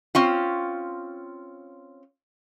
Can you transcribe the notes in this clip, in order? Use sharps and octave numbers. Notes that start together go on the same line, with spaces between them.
C4 C#4 F4